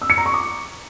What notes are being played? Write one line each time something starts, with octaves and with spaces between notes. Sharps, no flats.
E6
C#7
A#5
C#6
D6